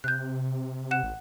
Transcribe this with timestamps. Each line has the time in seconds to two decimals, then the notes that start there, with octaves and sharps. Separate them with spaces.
0.04 C3 F#6 G6
0.91 F#5 F#6 E7
1.03 A1